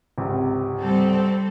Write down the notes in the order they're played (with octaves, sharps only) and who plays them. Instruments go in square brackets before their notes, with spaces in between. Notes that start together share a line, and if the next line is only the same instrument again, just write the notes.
[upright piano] G#1 C#2 C3
[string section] G3 C4 A4